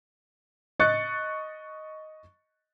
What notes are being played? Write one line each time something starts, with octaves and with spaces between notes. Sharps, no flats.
D#5 C#6 F#6 A6 C#7